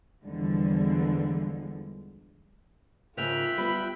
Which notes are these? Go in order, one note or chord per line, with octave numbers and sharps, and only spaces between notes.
E2 D3 F3 G3 G#3
G#2 C#3 A#3 F4 E5 G5 F#6 F7
G3 B3 B5